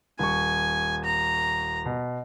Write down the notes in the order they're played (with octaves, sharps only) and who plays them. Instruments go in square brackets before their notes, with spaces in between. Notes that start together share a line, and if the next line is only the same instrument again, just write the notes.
[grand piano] D#1 C#6 [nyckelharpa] G#5
[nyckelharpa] A#5
[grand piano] B2